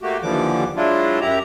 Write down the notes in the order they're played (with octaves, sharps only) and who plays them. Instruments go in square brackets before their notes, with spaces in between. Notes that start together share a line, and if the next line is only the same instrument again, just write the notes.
[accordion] A3 A#3 F#4 G4
D#2 D3 E3 F3 G3 D6
F#3 G#3 D4 E4 F4
F#2 E4 G4 A#5